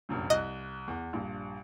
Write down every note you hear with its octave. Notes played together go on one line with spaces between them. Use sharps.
F1 A#1 F#2
C2 D#5 F#6
E2
A#1 G2